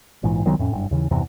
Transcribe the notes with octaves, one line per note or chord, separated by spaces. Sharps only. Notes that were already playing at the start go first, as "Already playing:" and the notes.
A#1 G#2 E3
C2 D#3 F#3 B3
F2 A2 C#4
F#1 G2
D#2 C#3 E3
E2 G2 C3 E3